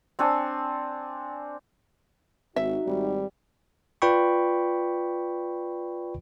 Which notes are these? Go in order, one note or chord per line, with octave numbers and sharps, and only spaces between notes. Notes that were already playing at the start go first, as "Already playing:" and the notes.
C4 D4 C#5 G#5
G#1 D#4 F#4 E5
G#1 G3
F4 B4 D5 G5 B5 C#6